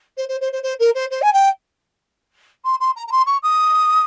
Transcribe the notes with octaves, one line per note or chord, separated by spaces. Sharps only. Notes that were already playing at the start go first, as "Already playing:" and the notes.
C5
C5
C5
C5
C5
A#4
C5
C5
G#5
G5
C6
C6
A#5
A#5
C6
C#6
D#6